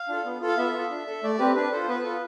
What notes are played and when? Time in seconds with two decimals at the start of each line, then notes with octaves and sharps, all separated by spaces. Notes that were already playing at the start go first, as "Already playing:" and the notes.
Already playing: F5
0.08 D4 F4 A4
0.25 B3
0.41 F4 A4
0.48 F5
0.58 B3 E5
0.73 F4 A4
0.90 D4
1.07 A4
1.23 A3 D5
1.38 C4 G4 B4
1.55 D4 B4
1.72 F4 A4 C5
1.88 B3 B4
2.03 F4 A4